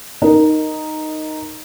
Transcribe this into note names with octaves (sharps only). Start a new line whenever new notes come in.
D#4 A#4